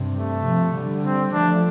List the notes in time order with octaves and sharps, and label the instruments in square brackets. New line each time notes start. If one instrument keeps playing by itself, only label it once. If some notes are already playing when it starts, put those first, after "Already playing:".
Already playing: [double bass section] G2 C3
[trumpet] A3
[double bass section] C3 F3
D3 G3
[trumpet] C4
[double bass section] F3 A3 [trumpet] D4